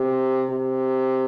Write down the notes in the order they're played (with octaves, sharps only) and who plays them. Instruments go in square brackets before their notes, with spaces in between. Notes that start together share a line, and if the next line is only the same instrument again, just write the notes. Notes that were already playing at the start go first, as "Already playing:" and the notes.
Already playing: [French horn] C3
C3